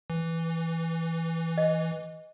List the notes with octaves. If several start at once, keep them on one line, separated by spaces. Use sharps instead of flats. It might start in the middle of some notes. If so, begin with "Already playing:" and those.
E3
D#5